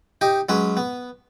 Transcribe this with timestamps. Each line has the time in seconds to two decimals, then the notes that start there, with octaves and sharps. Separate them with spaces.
0.21 D#4 G4 D#5
0.49 F#3 G#3 C#4 B4
0.77 B3